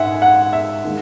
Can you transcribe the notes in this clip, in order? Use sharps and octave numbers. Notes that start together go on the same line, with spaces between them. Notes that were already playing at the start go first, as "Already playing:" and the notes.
Already playing: G#2 E5 F#5 G#5
F#5
E5
D#3 G#3